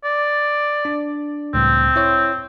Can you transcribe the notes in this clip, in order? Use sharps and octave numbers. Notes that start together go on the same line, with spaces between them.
D5
D4
C#2 A2 G3 C4
E4 C#5